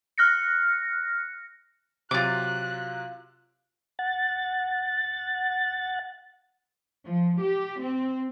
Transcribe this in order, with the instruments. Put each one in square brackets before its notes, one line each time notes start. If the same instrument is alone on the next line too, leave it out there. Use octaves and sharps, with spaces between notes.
[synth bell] F6 F#6 A#6 C#7
[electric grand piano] C3 F#3 [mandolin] F4 D6 [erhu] F#6
[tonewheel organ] F#5 A6
[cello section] F3
G4
C4